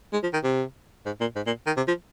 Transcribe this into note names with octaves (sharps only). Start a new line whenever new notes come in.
G#3
F3
D#3
C3
G#2
A#2
G#2
A#2
D#3
C3
F3